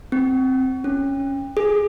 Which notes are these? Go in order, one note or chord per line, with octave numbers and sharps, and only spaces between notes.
C4
C#4
G#4